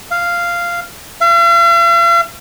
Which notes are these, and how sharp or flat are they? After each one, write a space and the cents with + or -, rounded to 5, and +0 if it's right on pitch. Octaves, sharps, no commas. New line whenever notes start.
F5 -10
F5 -45